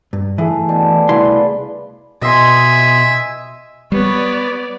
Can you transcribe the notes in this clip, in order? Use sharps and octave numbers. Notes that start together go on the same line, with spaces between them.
G2
E3 A3 G#4
B2 D4
C2 E4 B4 D5 F5 C6
B2 D#5 E5 G#5 C6
G3 B3 B4 C#5 D5